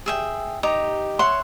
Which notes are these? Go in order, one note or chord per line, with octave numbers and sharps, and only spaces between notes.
G#4 E5 G5
D#4 G4 A#5
C#5 E5 F#5 C6